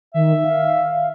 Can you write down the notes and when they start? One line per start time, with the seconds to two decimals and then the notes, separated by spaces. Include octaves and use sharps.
0.14 D#3 E5
0.44 F5